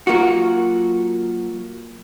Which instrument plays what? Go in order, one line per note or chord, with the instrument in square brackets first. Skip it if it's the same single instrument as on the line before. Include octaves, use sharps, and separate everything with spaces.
[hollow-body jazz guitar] F#3 A#3 F4 F#4